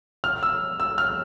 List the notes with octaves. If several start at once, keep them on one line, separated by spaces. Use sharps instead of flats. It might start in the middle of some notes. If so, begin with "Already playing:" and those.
F6
E6
E6
F6